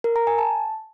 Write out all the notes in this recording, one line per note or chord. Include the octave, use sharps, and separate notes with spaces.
A#4
A#5
G#5
A5